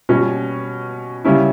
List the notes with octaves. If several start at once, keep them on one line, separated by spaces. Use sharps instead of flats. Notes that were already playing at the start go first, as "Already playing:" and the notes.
B2 G3 C#4
C#3 G3 C#4 E4